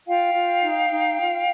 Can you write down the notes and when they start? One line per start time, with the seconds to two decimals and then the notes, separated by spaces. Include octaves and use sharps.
0.07 F4 F5 G5
0.34 F4
0.63 D#4
0.91 D#4
1.20 F4